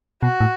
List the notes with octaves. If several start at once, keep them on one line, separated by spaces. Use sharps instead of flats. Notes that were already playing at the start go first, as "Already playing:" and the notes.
B2 F#4
A2